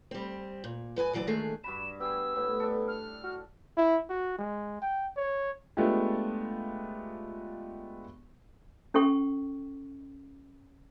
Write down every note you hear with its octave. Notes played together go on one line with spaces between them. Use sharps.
G3 C4
A#2
F#2 B4 D#5 G#5
D2 E3 F#3 C#5 D5
A#2 D3 D#3 G#3 A3 G#4
G2 F#4 B5 E7
B3 G4 G#4 E6
A2 B3
D4 A4
F6
F#4
E4
F#4
G#3
G5
C#5
G#3 A3 B3 D4 F4 G4
C#4 A4 G5 C#6